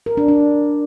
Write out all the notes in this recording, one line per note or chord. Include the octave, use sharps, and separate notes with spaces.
A#4
D4
D4